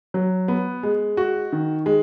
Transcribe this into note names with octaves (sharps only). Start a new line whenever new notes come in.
F#3
B3
G#3
F#4
D#3
G#3